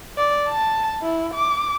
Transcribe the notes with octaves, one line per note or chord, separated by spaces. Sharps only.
D5
A5
E4
D6